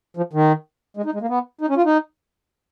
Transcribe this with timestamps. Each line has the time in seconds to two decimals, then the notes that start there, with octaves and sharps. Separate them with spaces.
0.17 F3
0.33 D#3
0.97 G#3
1.05 D#4
1.14 G#3
1.21 A#3
1.29 B3
1.61 D#4
1.69 C#4
1.77 F4
1.85 D#4